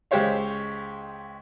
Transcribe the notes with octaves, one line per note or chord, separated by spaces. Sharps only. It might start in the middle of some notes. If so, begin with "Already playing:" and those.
C#2 G#3 G4 C5 C#5 F5